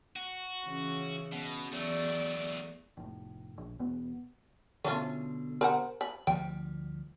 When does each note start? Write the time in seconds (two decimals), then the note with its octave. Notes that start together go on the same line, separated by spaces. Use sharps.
0.16 F#4
0.66 C#3 E3 C#4
1.32 B2
1.72 E2 F#3 A3 D5
2.97 F1 A2
3.58 A#1
3.79 E1 B3
4.84 B2 D3 A3 C#4 F4
5.61 A#4 C5 F#5
6.01 B5
6.27 D2 F3 G3 G5